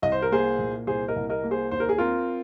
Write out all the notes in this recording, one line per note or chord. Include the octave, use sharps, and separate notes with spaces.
C2 D#5
C5
A#4
A#3 G#4 C5
A#2
C2 G#4 C5
A#4 D#5
C2
A#4 D#5
A#3
G#4 C5
D#2 C5
A#4
G#4
C4 F4 A#4